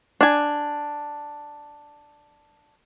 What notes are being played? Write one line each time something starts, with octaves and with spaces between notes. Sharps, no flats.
D4 G#5